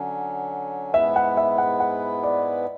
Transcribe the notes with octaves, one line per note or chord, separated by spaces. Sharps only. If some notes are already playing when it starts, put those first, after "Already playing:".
Already playing: D3 F#3 C#4
G#2 G#3 B3 E4 B4 E5
F#5
E5
F#5
F#5
D5